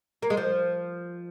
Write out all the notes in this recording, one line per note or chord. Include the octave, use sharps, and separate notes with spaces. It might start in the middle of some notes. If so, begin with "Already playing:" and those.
A#3
G#3
F3